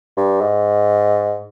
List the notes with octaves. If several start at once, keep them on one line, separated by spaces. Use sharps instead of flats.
G2
G#2